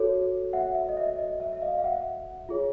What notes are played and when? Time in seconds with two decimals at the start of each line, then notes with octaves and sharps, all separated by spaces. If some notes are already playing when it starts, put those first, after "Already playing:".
Already playing: F#4 A4 C#5
0.53 E5 F#5
0.75 E5
0.89 D#5
0.97 E5
1.18 D#5
1.40 E5
1.53 E5
1.62 D#5 F5
1.78 F5
1.84 E5 F#5
2.49 F4 G#4 C#5